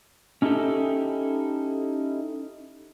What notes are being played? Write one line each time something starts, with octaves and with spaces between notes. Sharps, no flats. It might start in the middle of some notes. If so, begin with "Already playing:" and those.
C#4 D#4 E4 G4 A4